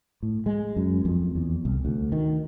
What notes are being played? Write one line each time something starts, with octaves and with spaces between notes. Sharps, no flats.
A2
G#3
F#2
F2
E2
C2
D2
D#3